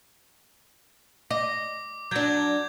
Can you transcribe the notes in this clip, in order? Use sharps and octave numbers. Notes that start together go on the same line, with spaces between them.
D#5 D6
F#3 D4 G6 G#6